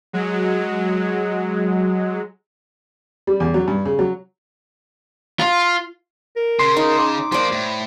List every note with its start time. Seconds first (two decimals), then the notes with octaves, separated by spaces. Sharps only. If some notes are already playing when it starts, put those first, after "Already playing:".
0.13 F#3 G#3
3.27 G3
3.40 E2
3.54 F#3
3.68 G2
3.86 C#3
3.99 F#3
5.40 F4
6.36 A#4
6.59 C#3 C6
6.77 D#4
6.98 D6
7.32 F3 A#3 C5 D5
7.52 A2